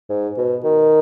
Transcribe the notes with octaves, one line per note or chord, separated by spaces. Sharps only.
G#2
B2
D#3